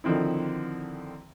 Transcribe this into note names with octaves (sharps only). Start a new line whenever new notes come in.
D3 D#3 F3 C4 E4